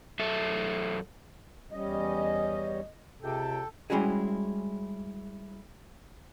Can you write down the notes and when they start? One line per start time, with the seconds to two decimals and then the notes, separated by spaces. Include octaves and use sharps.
0.19 F#2 A4 E5
1.72 E2 G3 C#4 D#5
3.22 C#2 C3 A4 G5
3.90 G3 G#3 C#4 E4 F#4 G#4